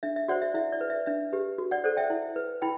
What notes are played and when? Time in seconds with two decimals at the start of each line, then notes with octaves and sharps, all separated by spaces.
0.03 D4 E5
0.16 E5
0.28 F#4 C5 D5 F#5
0.42 E5
0.54 E4 E5
0.72 D5
0.81 B4
0.90 E5
1.06 D4 E5
1.33 G4 B4
1.58 F#4
1.71 D5 F#5
1.84 A4 C5 D5 F#5
1.97 E5 G5
2.10 E4
2.36 B4
2.62 E4 G5 B5